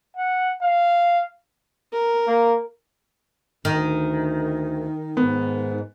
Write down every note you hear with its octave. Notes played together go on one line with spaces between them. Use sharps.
F#5
F5
A#4
A#3
D2 D#3
G#2 B3